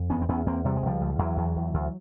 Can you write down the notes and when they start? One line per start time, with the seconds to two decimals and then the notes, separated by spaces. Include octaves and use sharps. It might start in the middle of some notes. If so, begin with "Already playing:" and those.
Already playing: F2
0.10 E2 B3 C#4
0.22 C4
0.29 E2 B3 C#4
0.46 E2 A#3 C4
0.65 C3 G3
0.76 G#3
0.82 C#2 F3 G3
1.01 C#2
1.19 E2 E3 F#3
1.37 E2
1.56 E2
1.74 D2